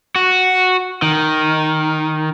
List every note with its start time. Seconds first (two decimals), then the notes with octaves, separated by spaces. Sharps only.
0.16 F#4
1.02 D#3